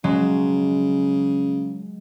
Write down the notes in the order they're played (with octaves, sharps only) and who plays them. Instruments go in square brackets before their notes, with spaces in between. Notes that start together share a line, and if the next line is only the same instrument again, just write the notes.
[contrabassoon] C#3 [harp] F#3 G#3